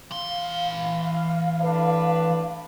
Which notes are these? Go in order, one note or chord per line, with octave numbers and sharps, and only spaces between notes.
E3 F5 C6
A2 D4 B4